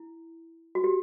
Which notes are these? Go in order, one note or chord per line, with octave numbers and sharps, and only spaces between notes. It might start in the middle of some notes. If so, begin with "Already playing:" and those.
Already playing: E4
F#4
G4